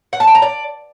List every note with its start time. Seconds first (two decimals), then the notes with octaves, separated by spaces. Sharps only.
0.13 F#5
0.20 A5
0.27 G5
0.35 A#5
0.42 D5